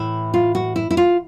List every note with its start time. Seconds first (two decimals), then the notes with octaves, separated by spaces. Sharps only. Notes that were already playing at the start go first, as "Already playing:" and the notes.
Already playing: A2 E3 A3 E4
0.34 F4
0.55 F#4
0.76 E4
0.91 E4
0.97 F4